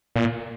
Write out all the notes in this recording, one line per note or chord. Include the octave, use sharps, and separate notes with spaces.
A#2